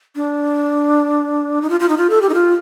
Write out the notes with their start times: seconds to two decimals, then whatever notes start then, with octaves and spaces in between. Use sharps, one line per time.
0.16 D4
1.62 D#4
1.70 F4
1.80 F4
1.89 D#4
1.97 F4
2.10 A4
2.22 G4
2.29 D#4
2.34 F4